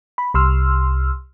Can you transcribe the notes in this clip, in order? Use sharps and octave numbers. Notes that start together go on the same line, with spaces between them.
B5
C2 C6 E6 F6